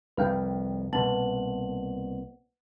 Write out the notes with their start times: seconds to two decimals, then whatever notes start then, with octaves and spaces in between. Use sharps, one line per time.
0.17 C2 F2 B4 F5 G5
0.93 C2 B2 A#3 B4 F#5 A5 F#7